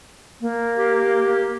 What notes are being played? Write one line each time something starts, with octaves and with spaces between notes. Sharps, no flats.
A#3
G4